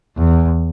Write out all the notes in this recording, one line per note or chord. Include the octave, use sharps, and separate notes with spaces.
E2